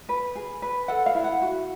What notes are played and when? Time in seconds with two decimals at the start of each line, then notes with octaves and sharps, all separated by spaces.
0.09 B4
0.35 G#4
0.62 B4
0.88 A4 F#5
1.06 F5
1.15 E4
1.24 F#5
1.42 F#4